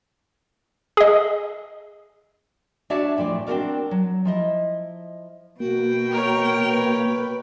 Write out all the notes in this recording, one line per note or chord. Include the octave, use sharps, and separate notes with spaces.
G#4 D#5
D4 F#4 C#5 D5 E5 A5
D2 A2 F3 D5
C4 D4 D#4 F#4 A#4 D5
F#3
F3 E4 D#5
B2 A#3 F#4 G5
A#4 C#5
B4